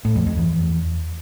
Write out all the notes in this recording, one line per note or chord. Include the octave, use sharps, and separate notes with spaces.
A2
F2
F2
E2